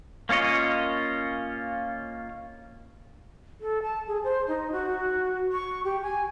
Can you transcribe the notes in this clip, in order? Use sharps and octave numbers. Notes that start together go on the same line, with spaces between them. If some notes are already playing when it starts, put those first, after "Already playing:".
A#3 C#4 F4 C#5 D#5
A4
A5
G#4
C5
D#4
F#4
C#6
G4
G#5